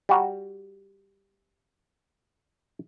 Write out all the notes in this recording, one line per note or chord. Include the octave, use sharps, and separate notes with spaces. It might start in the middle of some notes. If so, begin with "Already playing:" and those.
G3 F#4 A#5